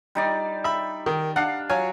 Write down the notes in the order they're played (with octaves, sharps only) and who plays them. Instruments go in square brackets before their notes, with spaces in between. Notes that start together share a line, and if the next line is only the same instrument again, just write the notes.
[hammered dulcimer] G3 D#4 D5
[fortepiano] E5 B5
D#3
[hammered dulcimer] D4 F5 [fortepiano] F#5
[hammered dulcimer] F#3 [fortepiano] C#5 F5 G#5